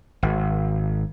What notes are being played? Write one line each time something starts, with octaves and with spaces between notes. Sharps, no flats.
G#1